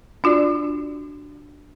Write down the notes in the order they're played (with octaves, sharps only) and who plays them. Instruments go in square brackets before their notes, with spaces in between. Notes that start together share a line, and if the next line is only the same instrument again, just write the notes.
[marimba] D4 F4 F#4 D5